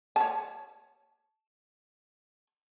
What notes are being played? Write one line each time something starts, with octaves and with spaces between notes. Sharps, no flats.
C#5 A5